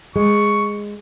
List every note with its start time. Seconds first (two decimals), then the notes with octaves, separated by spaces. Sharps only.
0.16 G#3 C#6